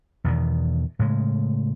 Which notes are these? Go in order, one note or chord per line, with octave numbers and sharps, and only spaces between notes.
E2 B2 D#3
A2 C#3 G#3